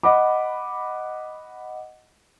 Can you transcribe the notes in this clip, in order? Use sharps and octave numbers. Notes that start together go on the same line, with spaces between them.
D#5 F#5 B5 D6